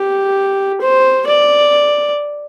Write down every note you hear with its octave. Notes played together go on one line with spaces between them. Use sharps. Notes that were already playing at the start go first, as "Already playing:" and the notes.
Already playing: G4
C5
D5